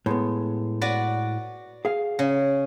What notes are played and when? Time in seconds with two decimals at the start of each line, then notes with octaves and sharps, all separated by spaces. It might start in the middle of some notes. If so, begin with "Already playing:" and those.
0.06 A2 G#3 B3
0.81 F#4 B4 D5
1.85 G#4 F5
2.19 C#3